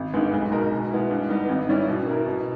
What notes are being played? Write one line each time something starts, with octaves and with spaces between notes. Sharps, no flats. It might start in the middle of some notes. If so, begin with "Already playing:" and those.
Already playing: G#1
G2 D#3 G#3 B3
B1
B2 G#3 D#4 A#4
B2
G#3 B3 E4
G2
G3 B3 D#4
G#1
G#2 G3 C#4 E4
B2
A#3 E4 A#4
B2